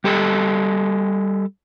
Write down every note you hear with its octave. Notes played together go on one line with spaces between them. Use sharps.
G3 G4 A4 D#5